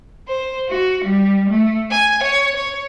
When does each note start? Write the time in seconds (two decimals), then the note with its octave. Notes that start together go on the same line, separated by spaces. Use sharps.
0.28 C5
0.68 F#4
1.04 G3
1.48 A3
1.92 G#5
2.23 C#5
2.55 C#5